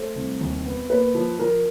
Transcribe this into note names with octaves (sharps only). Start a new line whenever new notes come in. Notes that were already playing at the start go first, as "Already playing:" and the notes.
Already playing: A3 C5
C2
D#2
B3
A#3 B4
F3
F3 A#4